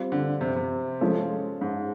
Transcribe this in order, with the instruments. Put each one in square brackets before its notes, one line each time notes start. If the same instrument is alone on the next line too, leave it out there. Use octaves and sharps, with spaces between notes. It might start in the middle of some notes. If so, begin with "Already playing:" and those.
Already playing: [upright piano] G3 C4 F4
[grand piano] D3
C3
C3
[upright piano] F3 G#3 C#4 F4 A4
[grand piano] G#2